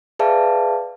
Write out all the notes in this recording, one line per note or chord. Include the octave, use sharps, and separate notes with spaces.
G#4 B4 D5 E5 F5 A5